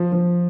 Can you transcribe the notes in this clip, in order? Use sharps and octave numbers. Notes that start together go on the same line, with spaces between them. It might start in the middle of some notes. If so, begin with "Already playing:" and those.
Already playing: F3
F3